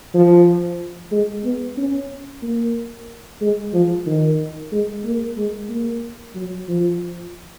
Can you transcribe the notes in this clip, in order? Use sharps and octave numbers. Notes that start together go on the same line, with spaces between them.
F3
G#3
B3
C#4
A#3
G#3
F3
D#3
G#3
A#3
G#3
A#3
F#3
F3